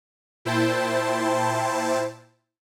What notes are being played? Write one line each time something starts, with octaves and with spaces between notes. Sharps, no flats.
A#2 E4 C5 G5 A5